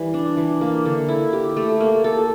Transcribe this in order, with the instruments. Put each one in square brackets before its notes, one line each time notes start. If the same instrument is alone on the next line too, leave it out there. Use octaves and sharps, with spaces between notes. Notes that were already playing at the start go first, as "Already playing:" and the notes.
Already playing: [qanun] E3 G3
D4
E3
A#3
D3
E4
G4
A3
A#3
A4